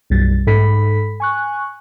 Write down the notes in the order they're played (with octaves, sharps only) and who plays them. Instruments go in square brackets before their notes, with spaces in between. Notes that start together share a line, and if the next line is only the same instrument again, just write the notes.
[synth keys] B1 F#2 G3 A6
G#2 A4 B5 B6
G#5 C#6 F#6